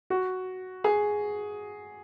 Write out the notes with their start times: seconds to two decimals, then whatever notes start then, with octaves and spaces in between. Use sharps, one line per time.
0.10 F#4
0.84 G#4